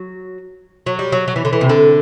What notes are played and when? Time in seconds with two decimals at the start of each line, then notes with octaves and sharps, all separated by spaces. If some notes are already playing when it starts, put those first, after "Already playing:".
Already playing: F#3
0.86 F#3
0.99 G3
1.12 F#3
1.28 F#3
1.36 E3
1.45 D3
1.53 E3
1.61 C3
1.69 D3